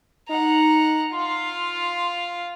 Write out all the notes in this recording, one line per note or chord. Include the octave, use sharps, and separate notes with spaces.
D#4 F#5 A#5
F4 F5 C6